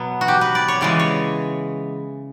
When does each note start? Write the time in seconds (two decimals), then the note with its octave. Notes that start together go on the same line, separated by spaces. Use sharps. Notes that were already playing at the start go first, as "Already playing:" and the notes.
Already playing: B2 F#3 B3
0.21 F#4
0.28 G4
0.41 B4
0.55 D5
0.68 C#5
0.81 C#3 E3 G#3 D5
0.99 C#5